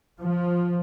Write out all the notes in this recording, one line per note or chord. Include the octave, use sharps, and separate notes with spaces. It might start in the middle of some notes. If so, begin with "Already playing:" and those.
F3